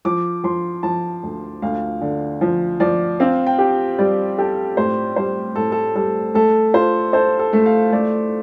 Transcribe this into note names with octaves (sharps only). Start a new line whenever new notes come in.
F3 D6
F3 C6
F3 A5
D2
D2 F5
D3
F3
F3 D5
C4 F5
G5
G4
G3 D5
G4 A4
A2 C5
G3 C5
A2 A4
A4
G3 A4
A3 A4
F4 C5
A4 C5
A4
A3
F5
A3 D5